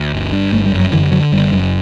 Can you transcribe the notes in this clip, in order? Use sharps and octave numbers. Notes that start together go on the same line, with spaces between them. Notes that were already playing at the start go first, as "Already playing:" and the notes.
Already playing: D2
G1
G2
G1 A3
G3
F#2
F#3
D3 E3
D3 F#3
F#1 G3
F#2